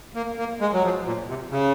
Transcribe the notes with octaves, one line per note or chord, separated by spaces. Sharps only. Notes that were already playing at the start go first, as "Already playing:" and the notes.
A#3
A#3
G#3
F#3
F3
A#2
C3
C#3